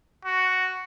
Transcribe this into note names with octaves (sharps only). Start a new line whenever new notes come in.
F#4